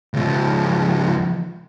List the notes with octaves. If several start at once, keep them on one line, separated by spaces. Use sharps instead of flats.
C#2 F3